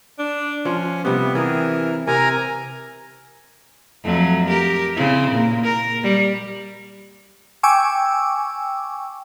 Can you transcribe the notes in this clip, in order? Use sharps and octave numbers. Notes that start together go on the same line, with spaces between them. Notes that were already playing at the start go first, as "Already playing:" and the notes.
D4
F3 C#4 F4
C3 G3 B3
E3 G#4 A#4
C3 A#4 G#5 A#5
F2 F#3 A3
G4 A#4
C#3 C4 E4
A#2 A#3
A#4
G3
G5 G#5 C#6 D6 E6